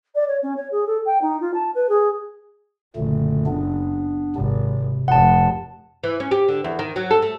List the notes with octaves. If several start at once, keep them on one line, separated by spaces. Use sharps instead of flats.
D5
C#5
C#4
C#5
G#4
A4
G5
D#4
F4
A5
B4
G#4
F#1 A#2 D3 A3
B3 D4
G#1 C3
F1 F#5 A5
E3
C#4
G4
D3
E2
D#3
F#3
A4
A3